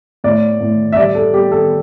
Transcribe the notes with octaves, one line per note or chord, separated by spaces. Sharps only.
A2 D5
A2
E5
G3 D5
A4
G3 G4
A4